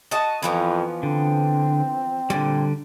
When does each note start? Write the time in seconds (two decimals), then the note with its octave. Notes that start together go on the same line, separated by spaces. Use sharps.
0.11 F#4 D#5 A5
0.42 F2 E3 F3 B3
1.03 D3 C4
2.30 A#2 D3 G3